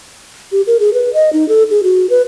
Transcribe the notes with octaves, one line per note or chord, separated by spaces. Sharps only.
G4
A#4
G#4
B4
D#5
D#4
A4
G#4
F#4
B4